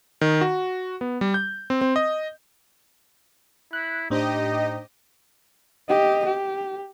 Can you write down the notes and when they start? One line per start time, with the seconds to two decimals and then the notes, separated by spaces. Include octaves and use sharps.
0.21 D#3
0.41 F#4
1.01 B3
1.21 G3
1.34 G6
1.70 C4
1.81 C4
1.96 D#5
3.73 E4 F#6
4.10 A2 D4 D#4 G4 C5 D#5
5.88 G4 D#5
6.26 G4